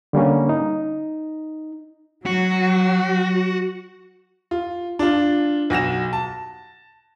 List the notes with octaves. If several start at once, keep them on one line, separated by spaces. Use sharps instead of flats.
D3 G3 A#3 C#4
D#4
F#3 F#4
F4
D4 F4
B1 F#4 A#6 E7
A5